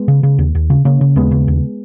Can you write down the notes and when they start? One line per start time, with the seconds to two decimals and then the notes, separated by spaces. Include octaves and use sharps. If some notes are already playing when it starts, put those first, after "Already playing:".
Already playing: G#3 B3
0.08 C#3
0.23 C#3
0.38 D#2
0.55 D#2
0.70 C#3
0.85 C#3 A#3 C#4
1.01 C#3
1.16 D#2 G#3 B3
1.31 C#3
1.48 D#2